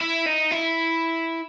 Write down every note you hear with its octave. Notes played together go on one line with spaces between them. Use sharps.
E4
D#4
E4